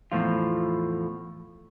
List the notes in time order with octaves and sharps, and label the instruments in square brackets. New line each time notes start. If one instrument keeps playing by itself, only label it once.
[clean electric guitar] E2 A2 F3 F4